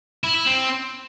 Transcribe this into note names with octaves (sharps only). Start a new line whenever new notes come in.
E4
E4
C4